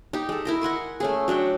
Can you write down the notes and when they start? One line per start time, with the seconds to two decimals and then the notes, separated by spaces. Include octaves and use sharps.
0.13 D#4 G4
0.29 G#3 A4
0.45 E4 A#4 D#5
0.61 D#5 F#5 G#5 C6
1.00 A3 C#4 G#4
1.28 F#3 D4 F#5 G5